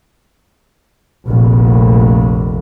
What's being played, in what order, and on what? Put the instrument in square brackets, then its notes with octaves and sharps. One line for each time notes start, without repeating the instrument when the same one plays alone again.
[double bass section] F1 A#1